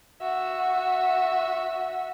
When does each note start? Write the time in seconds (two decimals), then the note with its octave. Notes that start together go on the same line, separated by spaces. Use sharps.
0.21 F#4 E5